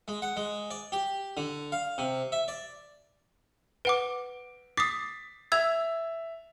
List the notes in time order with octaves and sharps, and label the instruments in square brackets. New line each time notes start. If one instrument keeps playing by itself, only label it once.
[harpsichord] G#3
F#5
G#3
D5
G4
D3
F5
C3
E5
D5
[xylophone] B4 F#5 D6 [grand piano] D7
[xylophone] D6 D#6 [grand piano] A6 B6 C7
[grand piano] E5 F7 [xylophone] E6 G#6